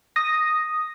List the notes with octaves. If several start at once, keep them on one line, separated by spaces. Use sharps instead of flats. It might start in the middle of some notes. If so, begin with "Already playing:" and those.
D#6 A#6